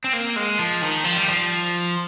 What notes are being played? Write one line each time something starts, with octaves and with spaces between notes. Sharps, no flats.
C4
A#3
G#3
F3
D#3
F3
G3
F3